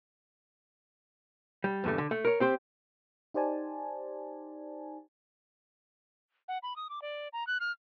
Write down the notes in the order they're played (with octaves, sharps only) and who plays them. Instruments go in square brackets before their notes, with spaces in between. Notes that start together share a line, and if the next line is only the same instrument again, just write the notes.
[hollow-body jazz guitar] G3
E2 G2 D3 A3
D3
A3
A#4 C#5
C4 G4 C5
[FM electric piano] D#4 G4 C5 D5 G#5 A5
[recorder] F#5
B5
D#6
D6
D5
A#5
F#6
F6